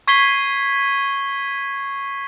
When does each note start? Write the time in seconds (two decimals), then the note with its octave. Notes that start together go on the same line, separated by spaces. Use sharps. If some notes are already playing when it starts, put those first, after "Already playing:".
0.08 C#6 G#6 B6 C7 G7